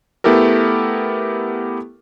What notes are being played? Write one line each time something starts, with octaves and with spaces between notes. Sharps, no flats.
A3 B3 E4 G4 A4 A#4